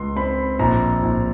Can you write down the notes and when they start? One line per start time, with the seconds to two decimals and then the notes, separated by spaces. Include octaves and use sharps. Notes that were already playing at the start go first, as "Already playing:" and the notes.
Already playing: C#2 C6
0.16 C4 B5
0.59 A#1 A#5
1.03 A#1